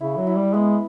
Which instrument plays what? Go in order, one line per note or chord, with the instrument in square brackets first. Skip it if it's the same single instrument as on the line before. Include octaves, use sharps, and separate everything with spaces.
[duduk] C#3 [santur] E4
[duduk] F#3
[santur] E4
[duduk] G3
[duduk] G#3 [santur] B3